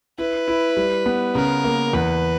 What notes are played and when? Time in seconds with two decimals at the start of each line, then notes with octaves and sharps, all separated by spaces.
0.18 E4 B4
0.48 E4
0.77 G3
1.06 B3
1.35 C#3 A#4
1.64 A#3
1.93 E2 B4